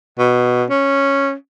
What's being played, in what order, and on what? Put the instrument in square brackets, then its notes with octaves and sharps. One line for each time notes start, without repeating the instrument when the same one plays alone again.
[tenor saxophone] B2
C#4